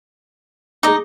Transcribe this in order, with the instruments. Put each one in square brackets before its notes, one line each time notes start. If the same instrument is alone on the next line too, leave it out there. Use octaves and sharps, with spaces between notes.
[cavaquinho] D#4 D#5 [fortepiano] G#4 D6